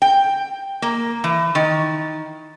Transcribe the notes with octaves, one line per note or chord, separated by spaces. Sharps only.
G5
A#3
E3
D#3